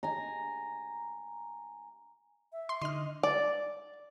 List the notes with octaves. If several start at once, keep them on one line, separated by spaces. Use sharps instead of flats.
G#5 A#5
E5
C6
D3 D#4 D#5 C6 F6
D5